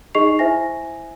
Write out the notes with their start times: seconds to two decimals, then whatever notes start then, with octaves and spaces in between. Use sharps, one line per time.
0.15 D#4 G#4 D#5 C#6 C7 F7
0.39 E4 C5 E5 G#5 A#6